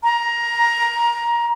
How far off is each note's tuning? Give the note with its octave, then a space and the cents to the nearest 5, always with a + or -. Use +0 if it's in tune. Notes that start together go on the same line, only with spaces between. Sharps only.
A#5 +15